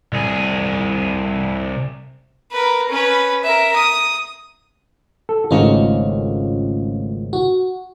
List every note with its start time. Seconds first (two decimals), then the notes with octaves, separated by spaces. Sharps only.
0.13 C2 G#4
2.52 A#4 B4
2.89 C#4 B4
3.44 A#4 E5
3.76 D#6
5.29 A4
5.51 G#1 C#3 A3 C#4 D#4 F4
7.33 F#4